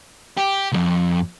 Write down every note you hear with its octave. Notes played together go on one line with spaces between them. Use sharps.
G4
C2 F2